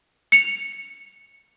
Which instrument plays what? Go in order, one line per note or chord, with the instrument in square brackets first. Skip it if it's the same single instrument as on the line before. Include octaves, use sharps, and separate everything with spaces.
[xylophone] C#7 F7